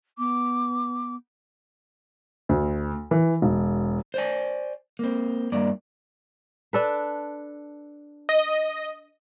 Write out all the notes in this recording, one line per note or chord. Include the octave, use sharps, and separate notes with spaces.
B3 D6
D2
E3
E1
C5 D5 G#5
A#3 C4
G2 A#3 D5
D4 A4 B4
D#5